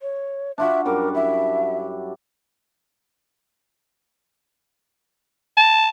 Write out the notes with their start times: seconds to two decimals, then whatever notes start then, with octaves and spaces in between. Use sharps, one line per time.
0.02 C#5
0.58 D4 F4 F#4 E5
0.85 F#2 G3 A#4 D6
1.15 E4 E5
5.57 A5